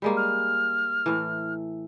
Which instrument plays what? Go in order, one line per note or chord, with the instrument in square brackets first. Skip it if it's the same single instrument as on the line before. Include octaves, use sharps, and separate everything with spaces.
[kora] G3 G#3 A#3
[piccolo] F6
[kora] A2 E3